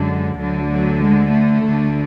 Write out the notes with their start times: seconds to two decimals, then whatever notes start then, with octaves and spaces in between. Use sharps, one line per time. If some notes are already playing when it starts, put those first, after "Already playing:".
Already playing: F#2 D3 G#3
0.40 D2 D3 F#3
0.70 F#3
1.02 G#3
1.34 A3
1.64 D2 D3